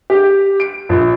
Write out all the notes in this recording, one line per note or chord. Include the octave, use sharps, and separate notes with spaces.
G4
D7
A#1